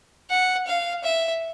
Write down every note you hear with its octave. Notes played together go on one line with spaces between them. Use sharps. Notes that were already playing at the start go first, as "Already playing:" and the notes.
F#5
F5
E5